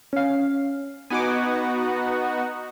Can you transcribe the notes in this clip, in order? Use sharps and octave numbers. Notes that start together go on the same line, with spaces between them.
C#4 F5
B3 D#4 F#4 G#5 D6